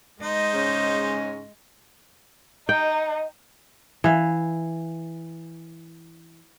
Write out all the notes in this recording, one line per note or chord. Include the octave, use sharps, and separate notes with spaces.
G#3 D#4 C5 D#5
G#2 C#3 C#4
D#4 D#5 G5
E3 F5